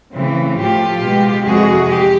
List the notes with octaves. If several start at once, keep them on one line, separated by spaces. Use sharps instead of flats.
C#3 E3 A3 C4
A2 F3 A3 F4 G4
B2 G#3 B3
F2 C3 E3 G#3 F#4 G#4
G4